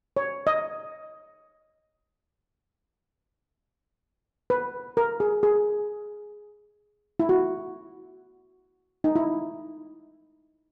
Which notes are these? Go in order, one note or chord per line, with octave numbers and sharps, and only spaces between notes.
C#5
D#5
B4
A#4
G#4
G#4
E4
F#4
D#4
E4